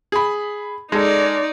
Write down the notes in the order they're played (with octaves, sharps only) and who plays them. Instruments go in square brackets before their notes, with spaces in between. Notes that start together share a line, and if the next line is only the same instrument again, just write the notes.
[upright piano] G#4 B5
[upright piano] G#3 A4 [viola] D#4 D5